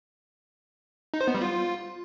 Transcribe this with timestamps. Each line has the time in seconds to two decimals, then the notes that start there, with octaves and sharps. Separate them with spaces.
1.14 D#4
1.21 C5
1.28 B3
1.35 G3
1.42 F4